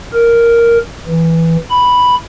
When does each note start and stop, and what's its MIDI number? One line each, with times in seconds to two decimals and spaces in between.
0.13 0.78 70
1.08 1.56 52
1.70 2.15 83